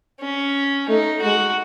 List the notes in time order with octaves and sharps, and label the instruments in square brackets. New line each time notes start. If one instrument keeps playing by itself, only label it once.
[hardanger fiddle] C#4
[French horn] A3 [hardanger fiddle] D#4
[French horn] G#3 [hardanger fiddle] F#4